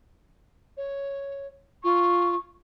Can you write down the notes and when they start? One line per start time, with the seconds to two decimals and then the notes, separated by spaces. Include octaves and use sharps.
0.77 C#5
1.84 F4 C#6